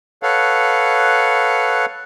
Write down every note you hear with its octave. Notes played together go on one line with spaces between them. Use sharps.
A4 B4 C#5 F5 F#5